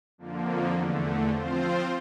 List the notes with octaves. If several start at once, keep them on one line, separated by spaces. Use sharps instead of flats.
F2 D3 F3 A#3
E2 D3 A3
F3 C4 F4 C5